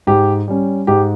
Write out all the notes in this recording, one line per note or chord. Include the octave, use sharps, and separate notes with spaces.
G#2 G4
G3 C#4
G#2 G4